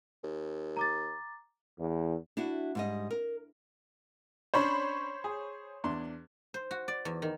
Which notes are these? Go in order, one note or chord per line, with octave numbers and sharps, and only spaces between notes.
D#2
A#5 D6 A6
E2
D4 E4 F#4
G#2 G3 D#5
A#4
C#4 D4 C5 C#5 B5
G#4
E2 D4 C6
C5
F#4
D5
E2
D#3